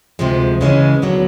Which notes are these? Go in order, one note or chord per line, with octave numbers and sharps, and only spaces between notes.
D2 C3 F3 G#3
F2 C#3 E3 G#3 C#4
D#2 D3 F#3 B3